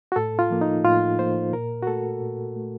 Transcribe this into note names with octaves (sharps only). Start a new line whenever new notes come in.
F#4
A2 A4
F4
F3 A#3
D#4
A2 F4
F3 A#3 C5
A#2 A#4
F#4
A3 A4
A#2
A3